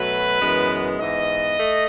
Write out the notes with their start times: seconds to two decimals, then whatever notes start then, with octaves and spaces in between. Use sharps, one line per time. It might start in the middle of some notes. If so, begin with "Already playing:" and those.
Already playing: B2 F#3 A3 B4
0.42 F#2 E3 G#3 B3
1.00 G#2 E3 B3 D#5
1.58 A3